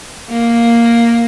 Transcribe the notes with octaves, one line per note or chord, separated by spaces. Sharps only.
A#3